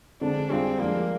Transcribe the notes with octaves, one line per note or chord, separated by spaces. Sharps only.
D3 G#3 C4 D4
G3 C4 D4 F4 G#4
F3 G#3 A#3 D4